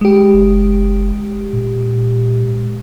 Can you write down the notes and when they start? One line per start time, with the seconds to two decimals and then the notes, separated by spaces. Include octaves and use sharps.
0.01 G#3 G4
0.34 F#1
1.53 A#2